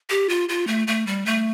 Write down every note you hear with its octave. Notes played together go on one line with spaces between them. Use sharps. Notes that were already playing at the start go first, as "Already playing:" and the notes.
G4
F4
F4
A3
A3
G3
A3